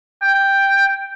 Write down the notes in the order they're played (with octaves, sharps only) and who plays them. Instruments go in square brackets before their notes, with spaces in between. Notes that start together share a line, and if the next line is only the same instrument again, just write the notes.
[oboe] G5